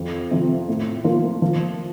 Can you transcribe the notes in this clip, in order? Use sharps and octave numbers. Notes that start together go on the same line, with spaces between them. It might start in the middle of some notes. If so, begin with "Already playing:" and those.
Already playing: F2
C3 F3
A2
F3 A#3 F4
F3